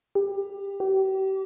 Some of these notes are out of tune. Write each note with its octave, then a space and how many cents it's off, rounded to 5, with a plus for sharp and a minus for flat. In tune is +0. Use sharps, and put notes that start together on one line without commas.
G4 +20
G4 -35